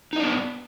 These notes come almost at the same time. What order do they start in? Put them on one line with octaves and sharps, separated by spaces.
D#4 D#5 D4 B3